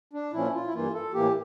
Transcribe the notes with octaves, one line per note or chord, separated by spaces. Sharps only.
D4
A#2 F3 C#4 E4
F4
E4
G2 E3 A#3 F4
A4
A2 E3 A#3 G4